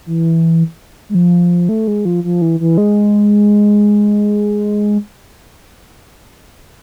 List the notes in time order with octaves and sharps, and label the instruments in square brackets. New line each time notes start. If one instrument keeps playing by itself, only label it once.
[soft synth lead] E3
G#3
F3
A3
G#3
F3
F3
E3
E3
G#3